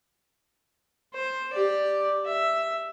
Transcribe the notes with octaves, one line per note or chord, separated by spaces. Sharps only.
C5
G4 D5
E5